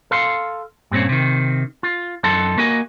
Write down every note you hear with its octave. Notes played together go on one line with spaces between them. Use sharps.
A4 F5 C6
G2 A#2 C4 C#4
C3 D#3
F4
F#2 D#4 A4 A5 C6
A#3 F#4 D#5 G#5